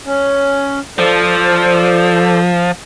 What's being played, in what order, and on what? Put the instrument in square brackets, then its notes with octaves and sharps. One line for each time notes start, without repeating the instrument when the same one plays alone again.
[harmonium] C#4
[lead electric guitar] F3 [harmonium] A4 C5 D5